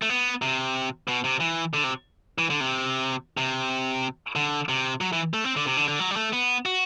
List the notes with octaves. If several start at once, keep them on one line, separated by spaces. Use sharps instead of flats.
A3
B3
C3
B2
C3
E3
D3
C3
E3
D3
C3
C3
D3
C3
F#3
E3
A3
C4
D3
C3
D3
D3
F#3
G3
A3
B3
F#4